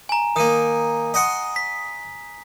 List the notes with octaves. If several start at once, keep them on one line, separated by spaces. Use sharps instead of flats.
G#5 A#5
D#3 A#3 D#6 D#7
D#5 F#5 C6
B6